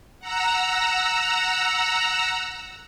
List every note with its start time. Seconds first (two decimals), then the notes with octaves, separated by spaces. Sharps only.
0.19 F#5 A#5 E6